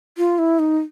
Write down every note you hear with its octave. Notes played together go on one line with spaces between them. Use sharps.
F4
E4
D#4